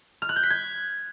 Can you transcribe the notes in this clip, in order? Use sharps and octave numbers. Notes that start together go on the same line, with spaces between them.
F6
F#6
G6
B6
G#6